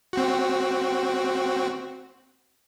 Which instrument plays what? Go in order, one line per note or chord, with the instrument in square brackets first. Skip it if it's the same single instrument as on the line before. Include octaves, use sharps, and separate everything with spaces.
[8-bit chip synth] C4 F#4